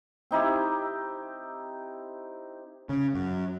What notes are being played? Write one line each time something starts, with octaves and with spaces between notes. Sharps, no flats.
C4 D#4 E4 G4
C#3
F#2